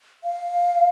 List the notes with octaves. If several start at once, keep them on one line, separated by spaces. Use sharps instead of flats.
F5